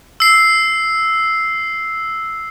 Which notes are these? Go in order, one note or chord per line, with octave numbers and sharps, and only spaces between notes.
E6 C7